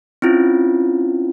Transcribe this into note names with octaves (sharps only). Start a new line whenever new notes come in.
C4 C#4 E4 F4